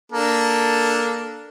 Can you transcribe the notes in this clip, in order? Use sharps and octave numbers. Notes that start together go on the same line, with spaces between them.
A#3 D4 A4